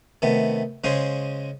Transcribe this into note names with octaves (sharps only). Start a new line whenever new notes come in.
C3 D#3 A3 B3
C#3 G#3 C#4 G#4 C5